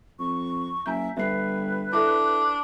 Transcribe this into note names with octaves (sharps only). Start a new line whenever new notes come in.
F2 C#6
F#1 E5 G#5 A#5 G6
G1 B4 E5 C7
D4 E4 A4 E5